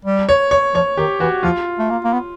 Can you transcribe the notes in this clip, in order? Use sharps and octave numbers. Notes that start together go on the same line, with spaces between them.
G3
C#5
C#5
F3 C#5
D#3 G4
E3 F#4
F3 F4
A3
A#3
A#3
B3